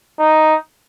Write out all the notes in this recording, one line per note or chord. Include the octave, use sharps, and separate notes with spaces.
D#4